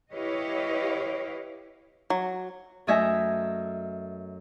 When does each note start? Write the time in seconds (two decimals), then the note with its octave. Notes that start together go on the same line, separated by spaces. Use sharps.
0.13 E4 G4 B4 C#5 D#5 F5
2.10 F#3
2.87 F#2 A3 F#4 D#5 E5 G#5